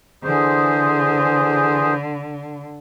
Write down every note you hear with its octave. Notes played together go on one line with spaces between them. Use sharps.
D3 E3 G#4 C5